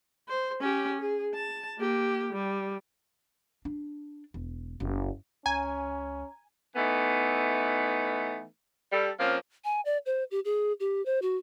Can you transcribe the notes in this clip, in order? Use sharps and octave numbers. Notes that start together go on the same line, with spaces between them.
C5
C#4 G4
G#4
A5
A#3 G4
G3
D4
E1
F#1
C#2 C#4 G#5 A#5
E3 A3 B3 D#4
G3 A4
F3 A#3 C4 C#4
G#5
D5
C5
G4
G#4
G4
C5
F#4